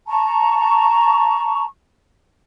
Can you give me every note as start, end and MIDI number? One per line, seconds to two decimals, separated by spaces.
0.07 1.64 81
0.07 1.64 82
0.07 1.64 85